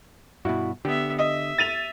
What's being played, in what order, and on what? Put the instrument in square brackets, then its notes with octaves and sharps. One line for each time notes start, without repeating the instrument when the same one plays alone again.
[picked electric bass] G2 B2 [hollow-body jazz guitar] E4 F#4
[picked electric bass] D3 [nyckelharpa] B3 E5 [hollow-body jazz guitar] G4
[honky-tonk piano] D#5 [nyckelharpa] E5
[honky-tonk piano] A6 D#7 F7